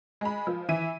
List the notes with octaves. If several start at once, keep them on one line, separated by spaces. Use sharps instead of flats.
G#3 B5
F3
E3 E5 D#7